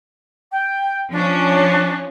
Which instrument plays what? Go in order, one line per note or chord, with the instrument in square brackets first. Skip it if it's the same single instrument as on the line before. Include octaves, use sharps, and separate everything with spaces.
[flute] G5
[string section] F3 C#4 [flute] D4